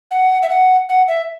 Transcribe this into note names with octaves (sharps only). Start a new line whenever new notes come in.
F#5
E5
F#5
F#5
E5